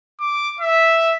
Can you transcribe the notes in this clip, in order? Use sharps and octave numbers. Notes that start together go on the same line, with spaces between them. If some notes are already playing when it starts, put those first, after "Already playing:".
D6
E5